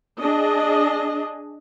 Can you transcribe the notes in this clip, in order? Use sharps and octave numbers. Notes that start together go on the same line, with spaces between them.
D4 G#4 D#5